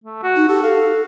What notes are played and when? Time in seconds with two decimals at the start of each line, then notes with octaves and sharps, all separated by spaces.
0.04 A3
0.23 F#4
0.36 D#4
0.48 G4 A4
0.63 A4 F5